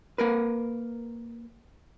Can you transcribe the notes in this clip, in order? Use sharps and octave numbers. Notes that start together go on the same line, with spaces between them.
A#3 A#4 B4